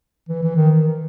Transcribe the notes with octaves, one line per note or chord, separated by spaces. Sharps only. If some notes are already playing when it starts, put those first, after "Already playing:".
E3
E3
D#3